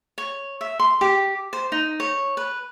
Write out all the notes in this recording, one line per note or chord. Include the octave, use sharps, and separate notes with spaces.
C#5
E5
C6
G4
C5
D#4
C#5
B4